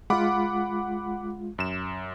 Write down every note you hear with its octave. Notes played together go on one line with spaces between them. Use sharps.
G#3 F4 F#5 B5 D6
F#2 E7